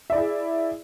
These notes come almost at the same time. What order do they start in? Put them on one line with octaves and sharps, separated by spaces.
E5 D5 E4 G#4